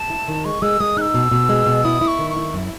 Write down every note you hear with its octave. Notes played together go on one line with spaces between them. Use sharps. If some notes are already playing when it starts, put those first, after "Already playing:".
Already playing: A5
E4
D#3
G#3 C#6
G#3 E6
G#3 D#6
D#4 E6 F#6
B2
B2
G#3
B2
E4 D#6
E4
C#6
D#3
C#6
E4
F#2